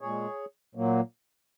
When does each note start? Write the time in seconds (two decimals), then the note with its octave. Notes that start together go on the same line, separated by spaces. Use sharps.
0.01 A#2 G#3 G#4 C#5
0.75 A#2 F#3 A#3